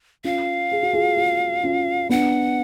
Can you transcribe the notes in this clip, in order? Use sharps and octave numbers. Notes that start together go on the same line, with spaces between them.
C#4 F4 F5
G#4
F#4
F4 G#4
F4 G#4
C#4 F4
B3 D4 F#5